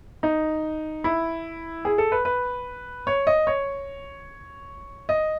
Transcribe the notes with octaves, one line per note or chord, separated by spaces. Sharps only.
D#4
E4
G#4
A4
B4
B4
C#5
D#5
C#5
D#5